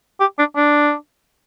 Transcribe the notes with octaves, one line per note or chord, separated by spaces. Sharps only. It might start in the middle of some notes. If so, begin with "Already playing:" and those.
G4
D4
D4